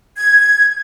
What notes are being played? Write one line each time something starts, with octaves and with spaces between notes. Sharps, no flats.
G#6